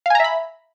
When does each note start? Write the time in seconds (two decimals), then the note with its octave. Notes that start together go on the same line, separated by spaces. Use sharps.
0.06 F5
0.10 G#5
0.15 A#5
0.20 E5
0.24 B5